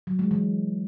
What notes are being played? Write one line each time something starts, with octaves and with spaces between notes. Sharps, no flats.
F#3
G#3
E3